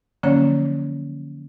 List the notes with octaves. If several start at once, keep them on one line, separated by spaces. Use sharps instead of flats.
D3 F3 F#3 A#3 C#4 C#5